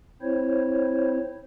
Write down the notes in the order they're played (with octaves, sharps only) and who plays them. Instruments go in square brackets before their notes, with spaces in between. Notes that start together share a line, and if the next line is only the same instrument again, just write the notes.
[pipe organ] C4 E4 C5 C#5